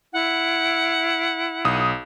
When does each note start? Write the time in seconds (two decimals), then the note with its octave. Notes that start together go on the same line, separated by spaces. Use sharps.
0.13 E4 F#5
1.65 B1 D#6